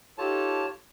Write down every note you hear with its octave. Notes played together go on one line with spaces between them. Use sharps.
D#4 F4 G4 A4 C#5 A5